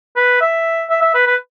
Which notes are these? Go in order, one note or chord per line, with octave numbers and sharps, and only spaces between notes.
B4
E5
E5
E5
B4
B4